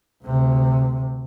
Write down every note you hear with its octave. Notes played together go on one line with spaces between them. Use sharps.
D2 C3